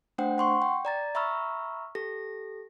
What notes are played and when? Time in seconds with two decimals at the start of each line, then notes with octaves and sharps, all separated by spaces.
0.18 A3 D4 C5 F#5 G5
0.38 F#5 C6 C#6
0.62 G5
0.85 D5 A#5 A6
1.15 E5 A#5 B5 C#6 E6 F6
1.95 G4 A4 A#6